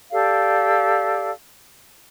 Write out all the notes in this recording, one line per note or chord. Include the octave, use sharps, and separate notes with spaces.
G4 A4 D5 F5